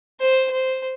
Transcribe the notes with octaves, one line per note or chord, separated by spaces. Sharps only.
C5
C5